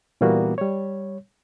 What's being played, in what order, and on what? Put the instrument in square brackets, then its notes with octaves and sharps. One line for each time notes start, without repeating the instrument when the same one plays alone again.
[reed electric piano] A#2 E3 G3 A#3 B3 F#4
G3 C#5